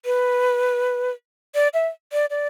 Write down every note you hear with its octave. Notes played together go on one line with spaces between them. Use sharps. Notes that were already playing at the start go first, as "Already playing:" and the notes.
B4
D5
E5
D5
D5